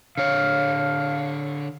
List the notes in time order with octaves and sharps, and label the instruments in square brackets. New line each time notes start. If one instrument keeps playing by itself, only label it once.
[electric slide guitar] D3 C#5 [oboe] F5